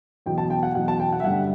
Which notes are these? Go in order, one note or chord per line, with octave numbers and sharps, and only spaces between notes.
E2 B2 F#3 G5
A5
G5
F#5
E2 B2 F#3 F#5
A5
G5
F#5
E5
G2 D3 G3 F#5